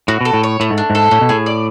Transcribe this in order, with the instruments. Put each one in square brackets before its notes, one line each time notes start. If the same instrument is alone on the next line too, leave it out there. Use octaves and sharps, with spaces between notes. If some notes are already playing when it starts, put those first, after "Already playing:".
[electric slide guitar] A2 [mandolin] F#4
[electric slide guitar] B2 [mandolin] A4
[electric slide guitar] A2
[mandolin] C#5
[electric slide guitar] A2 [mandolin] A3
[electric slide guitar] G#2
[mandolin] D4
[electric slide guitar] G#2
[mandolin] A4
[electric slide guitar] A2 [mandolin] C#4
[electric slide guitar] B2
[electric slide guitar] A2 [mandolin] G#4
[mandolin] D5